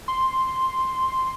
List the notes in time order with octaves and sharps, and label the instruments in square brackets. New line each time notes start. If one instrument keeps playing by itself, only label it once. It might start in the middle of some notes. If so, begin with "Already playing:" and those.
[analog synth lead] C6